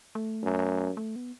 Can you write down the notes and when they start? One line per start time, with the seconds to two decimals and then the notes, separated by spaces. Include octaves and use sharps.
0.15 A3
0.43 F#2
0.97 A3
1.16 B3